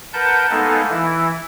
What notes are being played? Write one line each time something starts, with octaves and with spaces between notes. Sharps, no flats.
A#4 B4 F#5 A5 G6
G#3 A#3 B3 D#4 A4
E3 E4